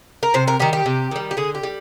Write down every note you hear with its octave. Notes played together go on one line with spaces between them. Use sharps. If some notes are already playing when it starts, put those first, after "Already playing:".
A#4
C3 C5
A#4
D#3 G3 G4
G4
C3
D#3 G3
G4
D3 G#4
G4
G3